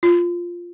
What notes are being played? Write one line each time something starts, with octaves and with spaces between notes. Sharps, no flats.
F4